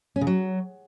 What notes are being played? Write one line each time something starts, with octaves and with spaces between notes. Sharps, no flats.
C#4
C#3
F#3